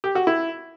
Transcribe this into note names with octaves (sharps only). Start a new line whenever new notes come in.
G4
F#4
E4